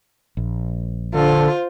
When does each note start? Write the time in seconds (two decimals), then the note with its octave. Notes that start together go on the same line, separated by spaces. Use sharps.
0.37 A#1
1.14 D3 F4 A4 C5